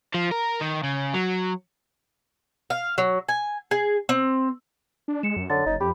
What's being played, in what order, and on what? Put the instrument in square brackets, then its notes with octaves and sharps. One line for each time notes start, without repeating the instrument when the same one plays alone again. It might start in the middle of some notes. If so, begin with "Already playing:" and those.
[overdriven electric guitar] F3
A#4
D#3
C#3
F#3
[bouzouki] F5
F#3
G#5
G#4
C4
[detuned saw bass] D4
[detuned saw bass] G#3 [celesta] C#7 E7
[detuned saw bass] F#2
[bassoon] D3 [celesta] C#5 A6
[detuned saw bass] F#1 [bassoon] D#4
[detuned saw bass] F2 [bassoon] G4 [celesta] B5